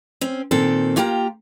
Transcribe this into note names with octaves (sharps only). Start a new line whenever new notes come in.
C4 C#4
A#2 D#3 C4 A4
A#3 F4 G4 G5 A5 A#5